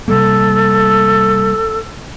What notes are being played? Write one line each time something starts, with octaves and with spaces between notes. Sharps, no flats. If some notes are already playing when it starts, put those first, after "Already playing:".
C3 G3 A#3 A4